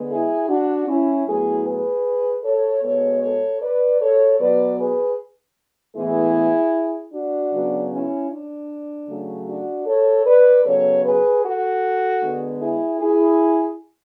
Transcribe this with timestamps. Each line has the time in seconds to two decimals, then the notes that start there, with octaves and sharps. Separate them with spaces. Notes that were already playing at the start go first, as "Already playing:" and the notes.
Already playing: D3 G#3 B3
0.10 E4 G#4
0.49 D4 F#4
0.88 C#4 E4
1.27 A2 F#3 B3 E4 G#4
1.66 G#4 B4
2.44 A4 C#5
2.83 B2 G#3 B3 A4 C#5
3.22 A4 C#5
3.61 B4 D5
4.01 A4 C#5
4.40 B2 F#3 B3 B4 D5
4.79 G#4 B4
5.96 A2 E3 G#3 B3 E4 G#4
7.13 D4 F#4
7.53 C#3 F#3 B3
7.91 C#4 E4
8.30 D4
9.08 C#3 F#3 A3
9.48 D4 F#4
9.87 A4 C#5
10.26 B4 D5
10.65 C#3 F#3 B3 A4 C#5
11.04 G#4 B4
11.43 F#4 A4
12.21 D3 G#3 B3
12.60 E4 G#4
12.99 E4 G#4